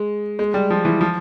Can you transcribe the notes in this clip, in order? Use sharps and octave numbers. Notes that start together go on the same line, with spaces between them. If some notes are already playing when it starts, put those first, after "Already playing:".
Already playing: G#3
G#3
G3
F3
E3
F3